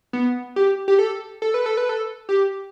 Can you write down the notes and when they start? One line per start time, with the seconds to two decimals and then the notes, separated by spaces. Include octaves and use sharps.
0.13 B3
0.56 G4
0.88 G4
0.99 A4
1.42 A4
1.54 B4
1.66 A4
1.77 B4
1.89 A4
2.29 G4